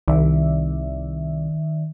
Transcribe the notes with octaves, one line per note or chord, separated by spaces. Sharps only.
C2 D#3 D5 E5